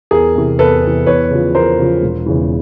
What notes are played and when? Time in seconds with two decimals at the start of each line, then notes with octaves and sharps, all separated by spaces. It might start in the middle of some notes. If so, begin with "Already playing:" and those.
0.11 E2 G#4 A#4
0.35 C3 E3
0.59 E2 A4 B4
0.83 C3 E3
1.06 E2 B4 C#5
1.31 C#3 F3
1.55 E2 A#4 C5
1.79 C#3 F3
2.03 E1
2.26 E2 C#3 E3